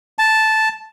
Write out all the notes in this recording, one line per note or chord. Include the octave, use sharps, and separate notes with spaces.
A5